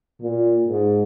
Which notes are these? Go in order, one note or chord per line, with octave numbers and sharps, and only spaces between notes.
A#2
G#2